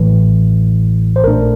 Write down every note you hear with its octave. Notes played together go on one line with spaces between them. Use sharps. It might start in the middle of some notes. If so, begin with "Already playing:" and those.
Already playing: A1 A2 E3
C5
A#1 A#2 A3 D4 A#4